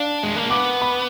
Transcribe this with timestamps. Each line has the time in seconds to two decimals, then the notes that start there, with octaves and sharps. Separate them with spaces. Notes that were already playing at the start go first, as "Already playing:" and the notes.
Already playing: D4 F5
0.23 G#3
0.36 A#3
0.50 B3 D6
0.82 B5